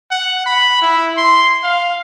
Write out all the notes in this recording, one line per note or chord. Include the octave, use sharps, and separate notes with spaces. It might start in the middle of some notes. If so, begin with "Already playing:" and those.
F#5
B5
E4
C6
F5